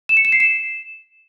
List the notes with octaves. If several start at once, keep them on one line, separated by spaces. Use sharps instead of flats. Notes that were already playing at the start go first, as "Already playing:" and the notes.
E7
C#7
E7
C7
E7